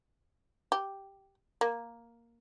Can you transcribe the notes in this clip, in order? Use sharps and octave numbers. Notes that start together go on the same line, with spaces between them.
G4
A#3